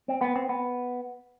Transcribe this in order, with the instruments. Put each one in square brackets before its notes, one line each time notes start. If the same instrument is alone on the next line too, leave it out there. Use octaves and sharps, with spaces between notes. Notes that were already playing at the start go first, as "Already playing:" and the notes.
[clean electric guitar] C4
B3
C4
B3